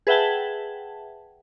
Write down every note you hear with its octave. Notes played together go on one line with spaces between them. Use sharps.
G#4 B4 E5 F#5 G5 A5